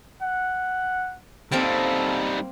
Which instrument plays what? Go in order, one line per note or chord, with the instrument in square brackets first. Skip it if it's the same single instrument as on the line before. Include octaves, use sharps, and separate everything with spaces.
[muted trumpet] F#5
[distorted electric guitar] G3 D#4 [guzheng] A#3 C4 A#4 [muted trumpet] A4